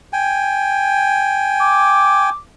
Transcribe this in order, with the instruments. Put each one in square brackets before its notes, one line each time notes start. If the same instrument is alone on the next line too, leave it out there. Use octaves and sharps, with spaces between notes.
[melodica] G5 G#5
[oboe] D6